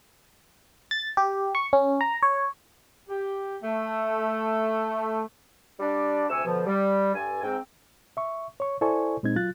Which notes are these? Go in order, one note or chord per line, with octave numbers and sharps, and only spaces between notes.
A6
G4
C#6
C#4
A#5
C#5
G4
A3
G3 D4 D5
D2 C3 G#5 C#6 E6
B2 D3 F3
G3
G2 A4 G#5
G#2 C4 G5
E5 C#6
C#5 C#6
E4 A4 C5 D5 G#5 C#6
A#2 G#3 C4 D#4 G#6
F#3 F4 F#6 A6